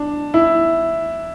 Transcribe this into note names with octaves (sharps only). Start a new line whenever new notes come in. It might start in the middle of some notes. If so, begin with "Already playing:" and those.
Already playing: D4
E4